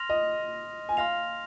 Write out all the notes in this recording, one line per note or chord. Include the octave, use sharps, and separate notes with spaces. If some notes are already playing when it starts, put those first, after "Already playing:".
Already playing: C6 F6 A#6 F7
D#5
G#5
F5 C6 F6 A#6 F7